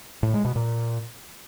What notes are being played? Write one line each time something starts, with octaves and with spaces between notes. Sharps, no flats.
A2
G#3
B2
A#2